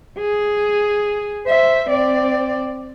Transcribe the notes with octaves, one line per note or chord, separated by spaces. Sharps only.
G#4
C5 E5
C4 D5